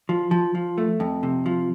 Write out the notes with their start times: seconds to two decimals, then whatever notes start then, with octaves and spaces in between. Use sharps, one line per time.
0.09 F3
0.31 F3
0.55 F3
0.78 A3
1.00 F2
1.23 C3
1.46 F3